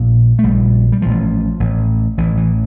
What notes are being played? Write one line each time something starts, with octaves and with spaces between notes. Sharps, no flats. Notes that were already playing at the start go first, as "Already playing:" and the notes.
Already playing: A#1 A#2
A3
A#1 A#2 G3
G3
A1 A2 F3
A1 A2
A1 A2 E3
E3